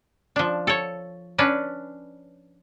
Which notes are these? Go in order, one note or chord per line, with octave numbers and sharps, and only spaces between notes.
F3 D4
A4 C#5
C#4 D4 B4